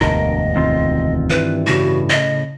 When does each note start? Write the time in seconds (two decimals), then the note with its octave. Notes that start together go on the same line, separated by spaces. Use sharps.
0.01 E1 D2 G2 A#4 D#5
0.56 D#3 C4 F4
1.30 G2 E3 B4
1.67 A2 C#3 F#4
2.10 D#5